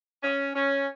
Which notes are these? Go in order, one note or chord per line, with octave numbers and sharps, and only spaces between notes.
C#4
C#4